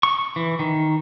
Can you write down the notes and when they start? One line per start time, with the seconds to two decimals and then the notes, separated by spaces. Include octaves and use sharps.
0.03 C#6
0.36 E3
0.59 D#3